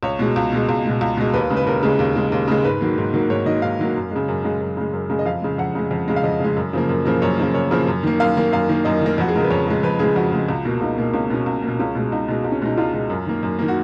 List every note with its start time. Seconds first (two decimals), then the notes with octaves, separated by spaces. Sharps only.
0.03 C#2 C#5
0.19 B2 G#3
0.36 C#2
0.53 B2 G#3
0.69 C#2
0.85 B2 G#3
1.01 C#2
1.17 B2 G#3
1.33 D#2 B4
1.50 C#3 G#3
1.57 B4
1.66 D#2 A#4
1.83 C#3 G#3
1.99 D#2
2.16 C#3 G#3
2.32 D#2
2.48 C#3 G#3
2.65 G#2 B4
2.81 D#3 F#3 A#3
2.98 G#2
3.14 D#3 F#3 A#3
3.30 G#2 C#5
3.46 D#3 F#3 A#3 D#5
3.62 G#2 F5
3.79 D#3 F#3 A#3
3.96 F#2
4.11 C#3 G#3
4.28 F#2
4.44 C#3 G#3
4.61 F#2
4.77 C#3 G#3
4.93 F#2
5.10 C#3 G#3
5.19 D#5
5.26 F2 F5
5.42 C#3 G#3
5.58 F2 F#5
5.75 C#3 G#3
5.91 F2
6.08 C#3 G#3
6.16 F5
6.23 F2 D#5
6.40 C#3 G#3
6.56 F#2
6.73 C#3 F3 A#3
6.89 F#2
7.05 C#3 F3 A#3
7.22 F#2 C#5
7.38 C#3 F3 A#3
7.54 F#2 C#5
7.71 C#3 F3 A#3
7.87 F#2
8.03 D#3 A#3
8.20 F#2 F5
8.37 D#3 A#3
8.52 F#2 F5
8.69 D#3 A#3
8.85 F#2 D#5
9.01 D#3 A#3
9.18 F2 F#4
9.28 G#4
9.35 C#3 G#3 A#4
9.44 B4
9.50 F2 C#5
9.67 C#3 G#3
9.83 F2 B4
9.99 C#3 G#3 G#4
10.16 F2 F#4
10.32 C#3 G#3
10.49 C#2
10.65 B2 A#3
10.81 C#2 D#4
10.98 B2 A#3
11.14 C#2 C#4
11.30 B2 A#3 C#4
11.46 C#2
11.62 B2 A#3
11.79 C#2 C#4
11.95 B2 G#3
12.12 C#2 D#4
12.28 B2 G#3
12.44 C#2
12.52 C#4
12.62 B2 G#3 D#4
12.78 C#2 F4
12.93 B2 G#3
13.10 F#2
13.26 D#3 A#3
13.43 F#2
13.59 D#3 A#3
13.68 F#4